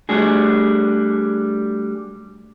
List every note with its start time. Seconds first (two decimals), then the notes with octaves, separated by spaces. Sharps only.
0.09 G3 A3 D4 F#4 G#4